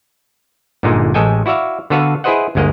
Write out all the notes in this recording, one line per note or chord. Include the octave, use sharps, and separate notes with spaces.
G1 A#2 D3 G#3 D#4
A1 G#3 A4 D#5 G5 G#5
E4 F#4 D5 E5 F5
D3 B3 F#4 A4 B4 F5
E4 G#4 B4 C5 D#5 F#5
G1 D2 G#3 A#3 D#5